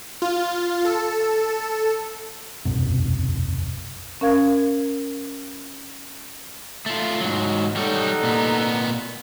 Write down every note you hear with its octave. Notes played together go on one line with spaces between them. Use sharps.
F4
A4
E1 B1 F#2 C3
C#4 A#4 F5 G#6
A3 F4
G#2 F#3
G3 D#4 A4 C#5 F#5
A#2 B3